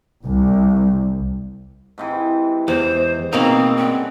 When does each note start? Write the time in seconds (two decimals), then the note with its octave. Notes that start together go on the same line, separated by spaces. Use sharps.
0.24 C2
1.98 G#2 C3 E3
2.68 E2 C5
3.33 G#2 B2 A#3 C4 D#4
3.77 G2 C#3 C4 F#5